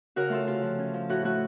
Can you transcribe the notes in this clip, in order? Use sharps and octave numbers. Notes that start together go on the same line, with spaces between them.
C#3 F#4 A#4
A3 F4 A4
C3 F4
F3
C#4
F3
A2 F#4
A3 F#4